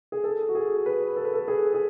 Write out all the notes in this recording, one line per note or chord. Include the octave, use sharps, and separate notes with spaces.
G#4
A4
F#4
G#4
B4
A4
B4
A4
G#4
G#4